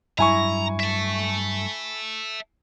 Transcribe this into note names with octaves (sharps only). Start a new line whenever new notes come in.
G2 F#3 E4 G#5 A#5 C#6
E5 A5